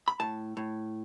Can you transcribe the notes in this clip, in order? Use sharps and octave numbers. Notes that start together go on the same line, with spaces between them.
B5
A2 A5
A2